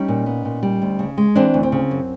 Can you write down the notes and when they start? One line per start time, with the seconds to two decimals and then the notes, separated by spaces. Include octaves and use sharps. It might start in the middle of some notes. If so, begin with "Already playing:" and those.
Already playing: G3 C#4 D#4
0.08 A#2
0.26 B3
0.45 A#2
0.63 G3
0.82 D2
0.99 C#3
1.18 G#3
1.35 E3 C4 D4
1.54 D2
1.63 C4
1.72 C#3
1.91 F#2